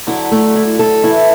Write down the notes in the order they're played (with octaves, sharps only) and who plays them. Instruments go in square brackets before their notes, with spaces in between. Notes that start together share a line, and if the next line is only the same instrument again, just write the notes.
[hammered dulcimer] D3 F#3 [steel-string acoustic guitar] E4
[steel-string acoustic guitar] A3
E4
A4
[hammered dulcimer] E3 A3 [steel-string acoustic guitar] E4